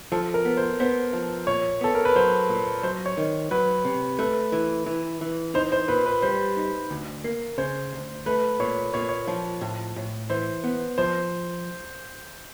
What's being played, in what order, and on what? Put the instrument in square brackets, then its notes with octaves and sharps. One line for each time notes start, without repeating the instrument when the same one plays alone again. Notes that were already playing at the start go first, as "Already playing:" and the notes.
[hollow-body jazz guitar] F3 [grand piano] A4
[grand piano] A#4
[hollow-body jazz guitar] B3
[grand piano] C5
[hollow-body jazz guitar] B3 [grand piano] C5
[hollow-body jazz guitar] F3
[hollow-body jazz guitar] A#2 [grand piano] C#5
[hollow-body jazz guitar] B3 [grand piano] A4
[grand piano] A#4
B4
[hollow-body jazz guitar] F#3 [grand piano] C5
[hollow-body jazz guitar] A#2
[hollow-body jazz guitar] F#3 [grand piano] C5
[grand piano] C#5
[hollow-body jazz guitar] D#3
[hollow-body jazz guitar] F#3 [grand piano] B4
[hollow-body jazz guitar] C3
[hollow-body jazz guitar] A3 [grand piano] B4
[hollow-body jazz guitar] E3
E3
E3
[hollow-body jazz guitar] D#4 [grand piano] C5
[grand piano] C5
[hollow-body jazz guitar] A#2 [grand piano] B4
[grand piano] B4
[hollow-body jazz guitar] G3 [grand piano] C5
[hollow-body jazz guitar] D#4
D2
A#3
[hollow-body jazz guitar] C#3 [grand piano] C5
[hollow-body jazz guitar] D2
[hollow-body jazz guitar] A3 [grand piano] B4
[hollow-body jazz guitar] A#2 [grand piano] C#5
[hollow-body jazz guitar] A#2 [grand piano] C#5
[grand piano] C#5
[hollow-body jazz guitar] F3
A2
A2
[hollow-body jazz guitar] E3 [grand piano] C5
[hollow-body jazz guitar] B3
[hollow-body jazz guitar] F3 [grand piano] C5